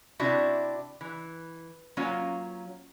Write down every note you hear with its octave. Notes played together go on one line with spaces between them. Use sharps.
C3 D4 E4 F#4 E5
E3
F#3 A#3 C#4 F4